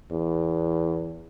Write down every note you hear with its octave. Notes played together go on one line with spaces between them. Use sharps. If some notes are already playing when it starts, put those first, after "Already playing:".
E2